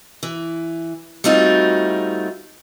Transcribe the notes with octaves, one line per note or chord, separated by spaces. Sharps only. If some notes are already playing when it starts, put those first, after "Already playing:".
E3
G3 A3 C4 D#4 F4 F#4